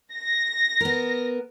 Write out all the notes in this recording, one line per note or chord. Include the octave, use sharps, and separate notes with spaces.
A#6
B3 A#4